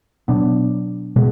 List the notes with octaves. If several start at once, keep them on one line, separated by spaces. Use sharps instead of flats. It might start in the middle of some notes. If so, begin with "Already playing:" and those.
B2 F#3 B3 D4
B2 G#3